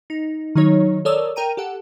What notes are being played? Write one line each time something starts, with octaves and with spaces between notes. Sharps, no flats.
D#4
D#3 F#3 D#4 C#5
A4 A#4 C#5 D5 D#6 E6
A#4 G5 A#5 D#7
G4 A4 F#5